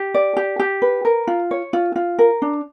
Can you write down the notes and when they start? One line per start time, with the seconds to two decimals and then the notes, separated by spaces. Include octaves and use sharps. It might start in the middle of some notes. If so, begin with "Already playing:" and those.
Already playing: G4
0.14 D5
0.37 G4
0.59 G4
0.82 B4
1.05 A#4
1.27 F4
1.51 C#5
1.73 F4
1.96 F4
2.19 A#4
2.42 D4